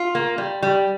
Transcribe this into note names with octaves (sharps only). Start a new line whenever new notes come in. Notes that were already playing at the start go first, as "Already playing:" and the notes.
Already playing: F4
A#3
G3
G3